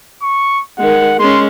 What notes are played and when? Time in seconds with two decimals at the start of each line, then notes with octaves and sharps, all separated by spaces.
0.22 C#6
0.79 D#3 G#3 F#5
1.19 G#3 C#4 C6